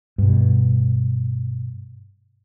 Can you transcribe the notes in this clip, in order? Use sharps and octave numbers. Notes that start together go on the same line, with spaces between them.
G2 B2